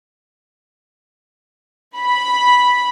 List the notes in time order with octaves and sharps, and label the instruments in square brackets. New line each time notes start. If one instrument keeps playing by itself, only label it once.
[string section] B5